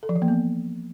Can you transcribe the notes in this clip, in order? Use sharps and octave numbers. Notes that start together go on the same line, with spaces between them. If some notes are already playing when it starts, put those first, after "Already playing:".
A4
F3
E3
A#3
B3